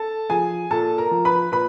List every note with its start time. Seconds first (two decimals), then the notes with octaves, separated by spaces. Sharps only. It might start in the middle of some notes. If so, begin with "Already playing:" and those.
Already playing: A4 A5
0.30 F3 G#4 G#5
0.71 A#2 A4 A5
0.98 A#4 A#5
1.11 F3
1.25 B4 B5
1.52 A#2 B4 B5